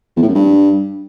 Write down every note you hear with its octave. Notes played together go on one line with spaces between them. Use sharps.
E2
A2
F#2
G2